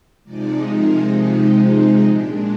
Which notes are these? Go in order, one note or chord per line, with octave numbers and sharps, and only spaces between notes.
C3 F3 G#3 D#4 D5
A#4
G4
F4
A#2 G#3 D4 G4